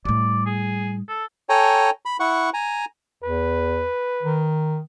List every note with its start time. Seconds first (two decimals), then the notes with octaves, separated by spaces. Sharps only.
0.05 A2 G3 D5
0.46 G#4
1.08 A4
1.49 A4 C#5 G5 G#5 A#5
2.05 B5
2.20 E4 F#5 C#6
2.54 G#5 A#5
3.23 E2 B4
4.22 D#3